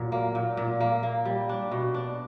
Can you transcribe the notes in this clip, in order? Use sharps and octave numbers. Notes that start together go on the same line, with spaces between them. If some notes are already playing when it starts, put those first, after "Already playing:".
Already playing: A#2 F#3
A#3
A#2
A#2
A#3
A#3
G3
D4
B2
D4